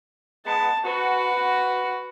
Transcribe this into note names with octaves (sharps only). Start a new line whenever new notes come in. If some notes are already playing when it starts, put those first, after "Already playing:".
G#3 B3 A5
F#4 B4